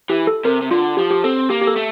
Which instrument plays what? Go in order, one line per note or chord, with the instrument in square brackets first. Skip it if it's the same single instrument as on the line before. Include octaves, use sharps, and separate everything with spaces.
[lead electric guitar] E3 [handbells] G4
[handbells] A4
[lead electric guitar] C3 [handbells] A#4
[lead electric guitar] C3
[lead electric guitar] D3 [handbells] F4
[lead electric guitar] F3 [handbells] G4
[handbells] G4
[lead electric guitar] C4 [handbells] A4
[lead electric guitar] A#3 [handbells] G4
[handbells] G4
A4
[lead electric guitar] A3